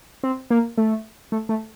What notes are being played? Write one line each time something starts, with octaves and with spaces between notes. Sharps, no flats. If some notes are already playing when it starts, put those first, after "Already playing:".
C4
A#3
A3
A3
A3